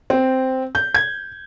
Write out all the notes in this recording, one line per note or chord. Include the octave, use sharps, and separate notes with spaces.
C4
G6
G#6